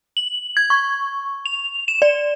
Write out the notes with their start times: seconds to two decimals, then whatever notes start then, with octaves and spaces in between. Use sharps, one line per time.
0.17 F#7
0.57 G#6
0.70 C#6
1.46 F7
1.88 E7
2.02 D5